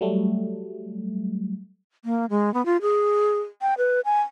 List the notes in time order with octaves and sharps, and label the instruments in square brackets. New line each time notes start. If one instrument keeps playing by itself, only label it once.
[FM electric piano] F#3 G3 A3
[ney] A#3
G#3
B3
F4
G#4
G5
B4
G#5